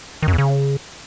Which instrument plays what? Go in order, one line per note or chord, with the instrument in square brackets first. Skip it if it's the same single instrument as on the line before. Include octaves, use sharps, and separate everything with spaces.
[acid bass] D#3
F#2
E2
C#3